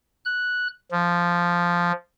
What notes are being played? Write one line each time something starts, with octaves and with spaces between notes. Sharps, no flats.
F#6
F3